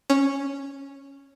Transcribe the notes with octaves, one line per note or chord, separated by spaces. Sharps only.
C#4